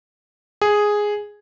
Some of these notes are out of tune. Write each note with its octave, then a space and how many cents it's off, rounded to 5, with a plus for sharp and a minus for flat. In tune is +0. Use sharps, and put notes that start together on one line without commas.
G#4 +0